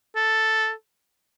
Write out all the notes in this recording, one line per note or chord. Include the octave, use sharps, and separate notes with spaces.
A4